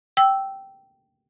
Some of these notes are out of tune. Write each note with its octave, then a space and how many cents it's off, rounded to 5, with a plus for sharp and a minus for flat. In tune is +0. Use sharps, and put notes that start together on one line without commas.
G5 -10 E6 +0